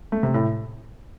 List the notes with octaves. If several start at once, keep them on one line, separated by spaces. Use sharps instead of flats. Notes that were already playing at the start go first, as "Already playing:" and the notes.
A3
C3
A2